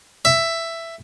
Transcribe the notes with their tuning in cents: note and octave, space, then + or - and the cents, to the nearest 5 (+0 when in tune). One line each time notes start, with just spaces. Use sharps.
E5 +10